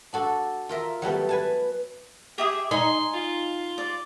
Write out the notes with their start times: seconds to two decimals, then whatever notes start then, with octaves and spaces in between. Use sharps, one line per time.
0.13 D4 F#4 A4
0.69 F4 A#4 E5
1.02 F#3 G3 A3 B3
1.29 B4 G#5 A5
2.38 G4 G#4 E5 D#6
2.71 D#4 G#5 C6
3.14 F4
3.78 D5